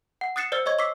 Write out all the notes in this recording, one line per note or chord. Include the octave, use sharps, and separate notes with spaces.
F#5
D#6 F#6 A6 C7 C#7 E7
C5 D5 E6 F6 A6 C#7
C#5 D#5 C#6 G#6
C#6 D6 E6 B6 C7